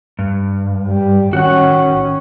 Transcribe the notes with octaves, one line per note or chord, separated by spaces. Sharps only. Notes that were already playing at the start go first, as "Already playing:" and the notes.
G2
G3
D#3 C#4 F#4 F#5